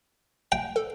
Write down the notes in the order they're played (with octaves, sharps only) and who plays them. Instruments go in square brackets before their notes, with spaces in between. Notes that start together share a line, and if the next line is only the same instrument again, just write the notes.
[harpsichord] G5
[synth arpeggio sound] A4